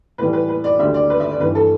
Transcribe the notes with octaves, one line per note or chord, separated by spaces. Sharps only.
A2 E3 G3 B4
B4
B4
D5
D2 D3 G3 E5
D5
B4
E5
D5
G2 E3 G3 B4
A4